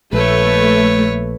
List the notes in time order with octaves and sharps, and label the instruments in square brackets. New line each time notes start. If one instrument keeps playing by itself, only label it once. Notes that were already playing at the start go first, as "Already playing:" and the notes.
[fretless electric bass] A#1 [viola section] A3 [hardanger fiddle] B4 C#5